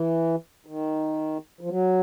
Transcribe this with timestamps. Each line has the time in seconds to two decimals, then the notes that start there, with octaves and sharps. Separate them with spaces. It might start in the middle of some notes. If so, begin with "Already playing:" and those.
Already playing: E3
0.66 D#3
1.61 F3
1.69 F#3